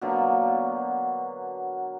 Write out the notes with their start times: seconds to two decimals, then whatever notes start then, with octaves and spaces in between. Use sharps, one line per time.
0.01 B2 D3 F#3 A#3